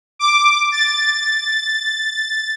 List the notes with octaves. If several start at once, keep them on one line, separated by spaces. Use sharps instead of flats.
D6
A6